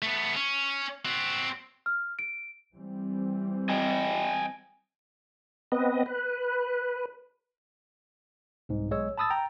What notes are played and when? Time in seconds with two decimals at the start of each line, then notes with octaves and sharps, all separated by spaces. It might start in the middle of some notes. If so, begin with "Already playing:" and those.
0.02 A3 B3
0.36 C#4
1.05 C4 F#4
1.86 F6
2.19 D7
2.74 E3 G3 C4
3.69 D#5 G5 G#5
5.72 B3 C4 B4 D#5
6.06 B4
8.69 C2 G#2
8.91 B1 G#3 C#5 E6
9.18 A5 B5 D#6 E6 A6
9.30 G5 A#5